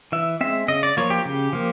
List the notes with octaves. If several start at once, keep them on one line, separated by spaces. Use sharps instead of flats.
E3 E5
G#3 C4 E5
C#3 D#5
D5
F3 A#3 C#5
G4
C#3
F3 A#3